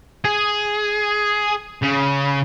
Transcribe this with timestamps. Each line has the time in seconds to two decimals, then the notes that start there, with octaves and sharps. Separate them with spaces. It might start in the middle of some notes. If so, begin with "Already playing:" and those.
0.25 G#4
1.83 C#3